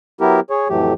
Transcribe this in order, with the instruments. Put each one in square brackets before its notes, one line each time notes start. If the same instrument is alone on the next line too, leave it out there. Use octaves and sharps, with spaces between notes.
[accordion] F#3 B3 E4 G4 A#4
G#4 C#5
F2 A2 E3 F#3 A3 G4